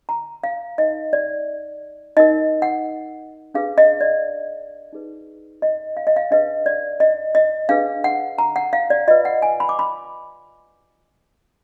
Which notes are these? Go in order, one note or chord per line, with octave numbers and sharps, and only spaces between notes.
A#5
F5
D#4 A#4 D#5
D5
D#4 A#4 D#5
F#5
D4 G#4 B4 F5
D#5
D5
D#4 G#4 B4
D#5
F5
D#5
F5
D4 G#4 B4 D#5
D5
D#5
D#5
D4 G#4 B4 F5
F#5
A#5
F#5
F5
D5
F4 B4 D#5
F#5
G#5
B5
D6
B5